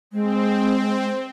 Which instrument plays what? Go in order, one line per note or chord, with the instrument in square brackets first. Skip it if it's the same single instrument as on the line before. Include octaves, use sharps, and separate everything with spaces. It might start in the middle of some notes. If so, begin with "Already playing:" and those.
[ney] G#3 [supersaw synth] C4